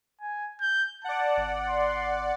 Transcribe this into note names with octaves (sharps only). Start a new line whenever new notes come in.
G#5
G6
D5 F#5 A5
G#1
C6